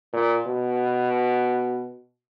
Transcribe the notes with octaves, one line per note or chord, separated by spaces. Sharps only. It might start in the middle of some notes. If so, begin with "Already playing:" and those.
A#2
B2